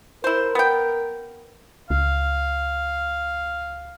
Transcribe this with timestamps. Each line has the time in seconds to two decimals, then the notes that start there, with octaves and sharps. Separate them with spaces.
0.24 E4 A#4 C5
0.55 B3 G5
1.90 C#2 F5